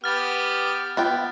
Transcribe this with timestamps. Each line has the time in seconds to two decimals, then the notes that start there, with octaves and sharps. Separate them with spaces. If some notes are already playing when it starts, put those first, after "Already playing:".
0.04 B3 G4 F6 A6
0.97 B3 F4 G5